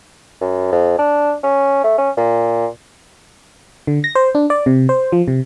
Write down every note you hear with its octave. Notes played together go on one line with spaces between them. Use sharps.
F#2
F2
D4
C#4
A3
C#4
A#2
D3
A#6
C5
D4
D5
C3
C5
F3
C3